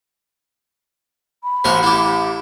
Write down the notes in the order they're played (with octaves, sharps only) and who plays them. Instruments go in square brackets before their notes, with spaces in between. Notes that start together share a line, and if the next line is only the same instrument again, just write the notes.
[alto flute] B5
[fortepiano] A1 [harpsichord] F#4 A#4 C5
[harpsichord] E4 G4